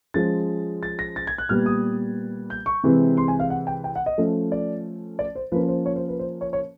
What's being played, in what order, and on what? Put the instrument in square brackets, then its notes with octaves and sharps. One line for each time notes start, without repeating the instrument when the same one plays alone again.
[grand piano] F3 G#3 C#4 A6
A6
A#6
A6
G#6
F#6
A#2 G3 B3 F6
D#6
G6
C#6
C3 E3 G#3 C4
C6
G#5
F5
F#5
G5
G5
F#5
D#5
F3 A3 C#4
D5
D5
C5
F3 A#3 C#4 B4
C5
C#5
C5
B4
C5
C#5
C#5